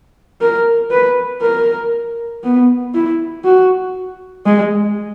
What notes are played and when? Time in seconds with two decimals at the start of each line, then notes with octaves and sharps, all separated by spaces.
0.41 A#4
0.91 B4
1.42 A#4
2.44 B3
2.94 E4
3.45 F#4
4.46 G#3